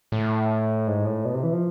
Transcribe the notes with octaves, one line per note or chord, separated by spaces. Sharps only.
A2
G#2
A2
B2
C3
E3
F3